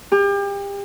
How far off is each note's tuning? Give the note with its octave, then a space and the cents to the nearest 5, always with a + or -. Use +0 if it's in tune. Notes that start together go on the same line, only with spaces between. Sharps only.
G4 +35